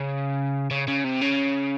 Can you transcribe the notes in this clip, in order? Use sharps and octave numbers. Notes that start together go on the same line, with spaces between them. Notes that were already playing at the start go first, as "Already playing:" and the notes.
Already playing: C#3
C#3
C#3
C3
C#3